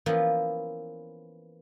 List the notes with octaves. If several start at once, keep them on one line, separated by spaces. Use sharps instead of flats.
E3 F3 A#3 B3 C#4 F4